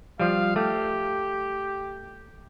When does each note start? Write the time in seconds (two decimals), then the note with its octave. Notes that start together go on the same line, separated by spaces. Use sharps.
0.20 F3 G3 F5
0.56 A3 G4